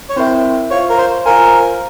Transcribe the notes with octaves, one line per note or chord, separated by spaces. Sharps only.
C#5
C4 E4 A#4 C5 E5 G5
F4 C5 C#5 F5
A#4
C5
F4 A#4 C5 F5 G#5